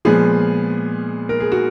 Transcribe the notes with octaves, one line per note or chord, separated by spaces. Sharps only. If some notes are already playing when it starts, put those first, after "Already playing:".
A#2 F3 G#3 B3 G#4
A#4
G#4
F#4